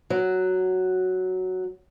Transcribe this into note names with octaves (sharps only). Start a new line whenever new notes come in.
F#3